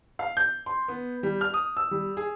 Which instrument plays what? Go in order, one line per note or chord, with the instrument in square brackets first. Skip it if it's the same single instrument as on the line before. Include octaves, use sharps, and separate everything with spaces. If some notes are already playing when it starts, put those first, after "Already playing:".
[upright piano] F5
G6
C6
B3
G3
F6
D#6
E6
G3
G#4